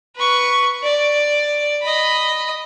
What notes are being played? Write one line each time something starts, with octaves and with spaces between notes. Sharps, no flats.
B4 C#6
D5
D#5 B5